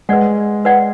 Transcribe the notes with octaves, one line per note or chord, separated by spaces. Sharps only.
G#3 B4 D5 F#5
B4 D5 F#5